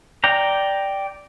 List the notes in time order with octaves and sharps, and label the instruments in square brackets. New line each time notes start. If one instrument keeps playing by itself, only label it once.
[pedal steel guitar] D5 G5 A#5